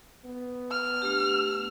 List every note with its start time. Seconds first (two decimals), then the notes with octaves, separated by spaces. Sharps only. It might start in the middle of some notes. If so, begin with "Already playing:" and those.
0.25 B3
0.71 F6
1.02 A3 D4 G4